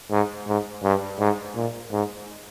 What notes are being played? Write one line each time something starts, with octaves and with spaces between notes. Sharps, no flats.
G#2
G#2
G2
G#2
A#2
G#2